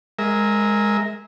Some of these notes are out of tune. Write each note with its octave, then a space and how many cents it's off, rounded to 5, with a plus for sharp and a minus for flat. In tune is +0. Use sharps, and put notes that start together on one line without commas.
G#3 +0 A#4 +0 E5 -25